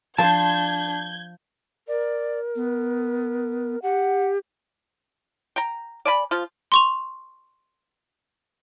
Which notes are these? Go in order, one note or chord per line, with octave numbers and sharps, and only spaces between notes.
F3 D4 C5 A5 G6 G#6
A#4 D5
B3
G4 F#5
G5 A#5
D5 G#5 B5
F3 F4
C6 C#6 F7